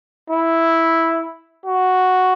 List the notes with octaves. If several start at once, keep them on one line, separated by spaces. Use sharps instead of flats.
E4
F#4